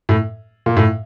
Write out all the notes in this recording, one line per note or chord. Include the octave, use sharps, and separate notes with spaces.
A2
A#2
A2